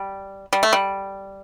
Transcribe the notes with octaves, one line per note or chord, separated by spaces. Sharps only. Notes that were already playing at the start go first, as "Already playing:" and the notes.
Already playing: G3
G3
A3
G3